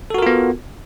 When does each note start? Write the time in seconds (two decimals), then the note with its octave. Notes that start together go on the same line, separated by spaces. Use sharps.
0.10 A4
0.14 F#4
0.18 A#4
0.22 F4
0.26 B3